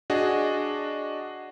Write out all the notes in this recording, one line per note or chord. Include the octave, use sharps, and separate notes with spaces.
D4 F#4 G#4 D#5